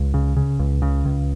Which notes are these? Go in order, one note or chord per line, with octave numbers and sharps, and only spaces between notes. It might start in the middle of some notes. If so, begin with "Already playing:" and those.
Already playing: C#2
C#3
C#3
C#2
C#3
C#2